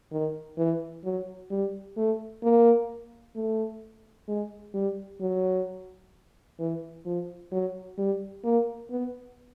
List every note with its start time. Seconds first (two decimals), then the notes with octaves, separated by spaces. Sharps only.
0.12 D#3
0.58 E3
1.04 F#3
1.51 G3
1.97 A3
2.43 A#3
3.36 A3
4.28 G#3
4.74 G3
5.21 F#3
6.59 E3
7.06 F3
7.52 F#3
7.98 G3
8.44 A#3
8.91 B3